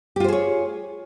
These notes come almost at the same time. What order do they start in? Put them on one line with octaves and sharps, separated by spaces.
G4 F4 C5 G#4 C#5